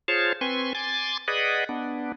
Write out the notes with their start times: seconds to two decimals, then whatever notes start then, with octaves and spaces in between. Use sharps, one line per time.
0.08 F4 G#4 C5 C#5 A5
0.41 C4 B4 G#5 C6 C#6
0.75 G#5 C6 D6 A6
1.28 G#4 B4 D5 D#5 F#5
1.69 B3 D4